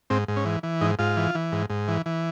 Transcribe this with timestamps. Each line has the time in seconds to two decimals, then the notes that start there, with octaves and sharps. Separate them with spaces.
0.10 G#2 C4
0.28 G#2
0.37 C#4
0.45 E3
0.63 E3
0.81 G#2 D#4
0.99 G#2 F4
1.17 E3
1.35 E3
1.52 G#2
1.70 G#2
1.88 E3
2.06 E3